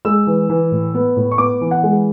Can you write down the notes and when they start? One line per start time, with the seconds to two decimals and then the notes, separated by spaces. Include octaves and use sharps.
0.05 G#3 E6
0.27 E3
0.49 E3
0.72 A2
0.94 B3
1.16 A2
1.31 C#6
1.38 B3 D6
1.61 E3
1.71 F#5
1.83 G#3